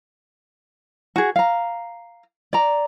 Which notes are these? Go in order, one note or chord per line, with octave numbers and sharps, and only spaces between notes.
F#4 G#4
F5 A#5
D5 A#5